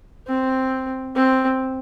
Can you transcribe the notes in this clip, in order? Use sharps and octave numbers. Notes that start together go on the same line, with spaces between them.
C4
C4